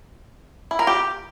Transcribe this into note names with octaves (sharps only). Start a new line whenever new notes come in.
E4
A#4
G4